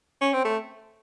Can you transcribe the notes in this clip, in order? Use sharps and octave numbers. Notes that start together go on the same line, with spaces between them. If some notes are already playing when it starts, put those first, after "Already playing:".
C#4
C4
A3